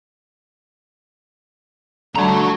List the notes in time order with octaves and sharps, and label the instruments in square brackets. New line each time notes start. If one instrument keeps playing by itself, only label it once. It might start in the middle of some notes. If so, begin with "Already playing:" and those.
[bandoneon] D3 A3 [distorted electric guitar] F#4 A#5